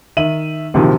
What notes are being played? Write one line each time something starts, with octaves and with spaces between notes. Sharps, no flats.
D#3 E5 D#7 F#7
A#1 C3 D#3 F3 F#3